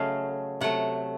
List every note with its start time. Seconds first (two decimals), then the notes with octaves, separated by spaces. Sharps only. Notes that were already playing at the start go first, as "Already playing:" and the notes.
Already playing: C#3 F#3 A3 D#5 F5
0.61 C3 F#3 A3 F#5